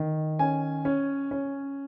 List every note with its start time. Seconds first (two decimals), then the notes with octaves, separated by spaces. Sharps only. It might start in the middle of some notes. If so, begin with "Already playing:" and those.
Already playing: D#3
0.39 C#4 G#5
0.85 C#4
1.31 C#4